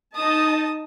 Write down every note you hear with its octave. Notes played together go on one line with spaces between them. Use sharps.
D#4 D#5 A5 D#6